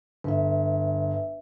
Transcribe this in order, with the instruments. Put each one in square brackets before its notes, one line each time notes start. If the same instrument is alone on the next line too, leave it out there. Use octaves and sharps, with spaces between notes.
[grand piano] G1 [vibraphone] B4 E5